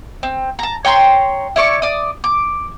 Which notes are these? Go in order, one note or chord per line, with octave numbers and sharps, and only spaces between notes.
C4
A5 A#5
C#5 G5 A#5 C6
E4 D5 C#6
D5 D#6
D6